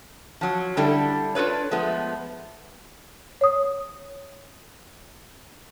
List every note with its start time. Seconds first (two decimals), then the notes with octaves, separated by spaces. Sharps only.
0.41 F3 F#3
0.77 D3 G3 D4 E4 G4 A4
1.35 D4 F4 A4 B4 C#5
1.71 F3 G#3 A3 B3
3.41 C#5 D#6